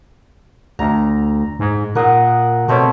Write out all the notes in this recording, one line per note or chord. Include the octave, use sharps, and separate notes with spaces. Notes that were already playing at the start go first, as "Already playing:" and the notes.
D2 A#5
G#2
A#2 A#4 F#5 D#6
B2 A3 C4 C#5